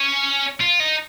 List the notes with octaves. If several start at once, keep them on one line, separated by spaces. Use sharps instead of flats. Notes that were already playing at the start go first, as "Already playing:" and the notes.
Already playing: C#4
F4
D#4